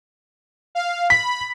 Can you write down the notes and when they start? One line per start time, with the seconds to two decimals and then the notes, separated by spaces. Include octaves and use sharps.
0.75 F5
1.10 B5 B6